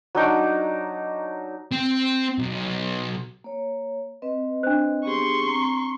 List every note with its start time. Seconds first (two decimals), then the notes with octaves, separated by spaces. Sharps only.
0.15 F#3 D4 D#4 D6
1.72 C4
2.38 B1
3.44 A#3 C#5
4.22 C4 B4 D#5
4.63 D4 C5
5.05 B3 G4 G#4 C6 C#6
5.43 C4 A#5